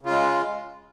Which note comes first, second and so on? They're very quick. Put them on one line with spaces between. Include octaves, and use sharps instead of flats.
C#3 F4 G#3